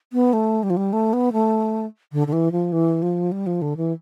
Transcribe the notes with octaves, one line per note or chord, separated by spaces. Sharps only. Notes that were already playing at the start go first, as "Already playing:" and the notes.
B3
A3
G3
F3
G3
A3
B3
A3
D3
D3
E3
F3
E3
F3
G3
F3
D3
E3